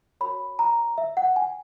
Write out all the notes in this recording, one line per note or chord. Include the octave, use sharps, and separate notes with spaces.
F#4 A#4 C#5 B5
A#5
E5
F#5
G#5